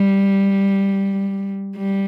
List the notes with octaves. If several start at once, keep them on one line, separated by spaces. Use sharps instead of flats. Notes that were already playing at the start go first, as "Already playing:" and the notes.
Already playing: G3
G3